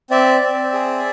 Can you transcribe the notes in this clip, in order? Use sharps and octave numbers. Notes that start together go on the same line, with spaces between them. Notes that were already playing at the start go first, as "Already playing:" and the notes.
C4 D5 E5
C4
G#4